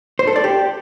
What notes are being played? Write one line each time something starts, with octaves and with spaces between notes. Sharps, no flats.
C5
A4
D5
G4